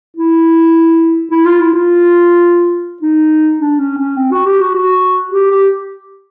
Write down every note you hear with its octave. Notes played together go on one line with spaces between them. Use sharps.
E4
E4
F4
E4
F4
D#4
D4
C#4
C#4
C4
F#4
G4
F#4
F#4
G4
G4